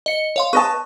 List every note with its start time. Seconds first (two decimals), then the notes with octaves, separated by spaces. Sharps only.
0.06 D#5 C#7
0.36 C#5 F5 C6
0.53 B4 D#5 A5 C#6 D#6